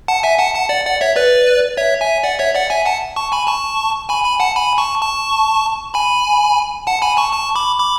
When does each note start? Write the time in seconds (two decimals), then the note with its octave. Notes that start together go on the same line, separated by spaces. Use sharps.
0.08 F#5 A5
0.23 E5 G#5
0.39 F#5 A5
0.55 F#5 A5
0.69 D5 F#5
0.86 D5 F#5
1.01 C#5 E5
1.16 B4 D5
1.77 C#5 E5
2.01 E5 G#5
2.24 D5 F#5
2.39 C#5 E5
2.55 D5 F#5
2.70 E5 G#5
2.86 F#5 A5
3.16 A5 C#6
3.32 G#5 B5
3.47 A5 C#6
4.09 G#5 B5
4.24 G#5 B5
4.40 F#5 A5
4.56 G#5 B5
4.78 A5 C#6
5.01 A5 C#6
5.94 G#5 B5
6.87 F#5 A5
7.02 G#5 B5
7.17 A5 C#6
7.33 A5 C#6
7.56 B5 D6
7.79 B5 D6